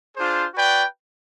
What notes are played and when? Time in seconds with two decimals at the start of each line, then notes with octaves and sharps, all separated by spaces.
0.17 D4 F4 G#4 C5
0.54 F#4 B4 D5 G5